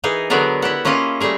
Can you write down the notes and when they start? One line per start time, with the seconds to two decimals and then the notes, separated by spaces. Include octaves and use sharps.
0.04 E3 D#4 G#4 A#4
0.30 D3 F#3 B3 G#4 A#4 D5
0.62 E4 G4 F#5
0.85 A#3 C#4 E4 F4 D#5
1.20 G3 A3 G#4 A#4